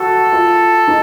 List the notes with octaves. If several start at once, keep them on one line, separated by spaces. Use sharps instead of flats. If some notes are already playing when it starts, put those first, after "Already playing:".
Already playing: F#4 A4
F4
D#4